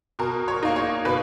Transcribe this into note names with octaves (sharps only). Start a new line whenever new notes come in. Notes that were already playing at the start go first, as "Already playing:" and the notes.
B2 A#4
C#5
A#3 D#4
C#5
B2 B4